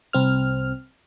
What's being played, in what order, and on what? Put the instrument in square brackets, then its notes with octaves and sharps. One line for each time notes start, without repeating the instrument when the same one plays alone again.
[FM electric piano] C2 C4 F6